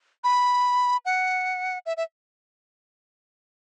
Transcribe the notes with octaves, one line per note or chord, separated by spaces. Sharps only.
B5
F#5
E5
E5